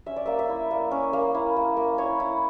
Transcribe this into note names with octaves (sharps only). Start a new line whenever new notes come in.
C#4 E5
D5
A#3 E5
E5
E4
A#3
C#4
A#3
E4
A#3
A#3
E4 C#5
E4